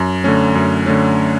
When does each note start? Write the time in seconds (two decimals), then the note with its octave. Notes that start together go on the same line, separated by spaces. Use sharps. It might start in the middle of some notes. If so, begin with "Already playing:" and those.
Already playing: F#2
0.24 D3 A3 C#4
0.55 F#2
0.86 D3 A3 C#4